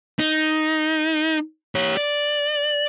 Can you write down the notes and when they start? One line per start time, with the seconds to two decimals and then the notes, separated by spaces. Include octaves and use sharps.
0.19 D#4
1.75 G4 C#5
1.97 D5